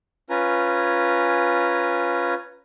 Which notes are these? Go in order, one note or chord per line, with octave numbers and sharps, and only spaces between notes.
C#4 F4 B4 G#5 A#5